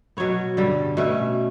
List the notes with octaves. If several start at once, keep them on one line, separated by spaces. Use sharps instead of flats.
B2 F#3 B3 C#5
G2 D3 G3
B2 A3 C#4